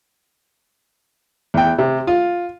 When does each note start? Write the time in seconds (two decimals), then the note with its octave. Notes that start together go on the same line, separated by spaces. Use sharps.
1.54 E2 G5
1.78 C3
2.07 F4